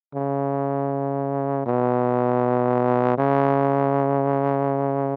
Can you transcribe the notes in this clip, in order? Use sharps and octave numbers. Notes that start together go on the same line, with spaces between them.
C#3
B2
C#3